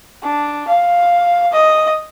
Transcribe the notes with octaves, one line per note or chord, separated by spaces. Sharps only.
D4
F5
D#5